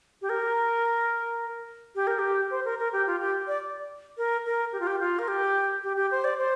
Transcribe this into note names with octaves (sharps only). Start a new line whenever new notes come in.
G4
A#4
G4
A#4
G4
C5
A#4
A#4
G4
F4
G4
D5
A#4
A#4
G4
F4
G4
F4
A#4
G4
G4
G4
C5
D5
C5